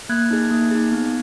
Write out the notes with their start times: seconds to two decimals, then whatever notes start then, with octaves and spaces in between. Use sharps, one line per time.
0.09 A#3 F#6 G#6
0.31 D#4 G#4
0.51 A#3
0.71 D#4 G#4
0.92 B3